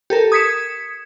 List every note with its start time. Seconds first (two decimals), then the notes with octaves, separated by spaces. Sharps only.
0.10 G4 A4 A#4
0.32 D#6 G#6 B6 C#7 E7